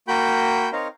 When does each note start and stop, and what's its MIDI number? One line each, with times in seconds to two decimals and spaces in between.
0.08 0.70 58
0.08 0.70 66
0.08 0.70 79
0.08 0.70 83
0.08 0.70 91
0.73 0.88 60
0.73 0.88 63
0.73 0.88 70
0.73 0.88 73
0.73 0.88 77
0.73 0.88 82